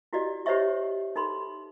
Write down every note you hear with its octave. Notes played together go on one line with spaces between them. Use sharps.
E4 F#4 G4 D5 D#5
G4 C5 C#5 D#5 E5 C#6
D#4 A4 B5 C6